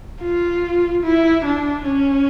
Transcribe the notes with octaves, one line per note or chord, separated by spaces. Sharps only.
F4
E4
D4
C#4